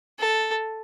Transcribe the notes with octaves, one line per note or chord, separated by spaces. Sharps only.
A4